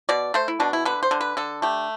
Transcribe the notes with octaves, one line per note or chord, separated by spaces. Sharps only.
B2 D5
A3 C5
E4
B2 D4
E4
D3 B4
C5
D3
B4
D3 A4
A3 G4